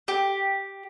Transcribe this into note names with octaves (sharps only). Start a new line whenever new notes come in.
G4